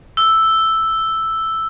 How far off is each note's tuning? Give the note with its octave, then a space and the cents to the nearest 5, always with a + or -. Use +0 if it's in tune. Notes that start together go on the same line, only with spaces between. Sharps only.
E6 +0